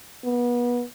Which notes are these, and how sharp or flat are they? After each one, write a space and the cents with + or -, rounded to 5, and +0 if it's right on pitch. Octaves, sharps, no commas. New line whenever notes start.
B3 -30